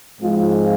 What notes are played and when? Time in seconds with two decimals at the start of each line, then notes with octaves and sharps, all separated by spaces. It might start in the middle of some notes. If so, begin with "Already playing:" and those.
0.20 G#2 F3 G#3 C4 F4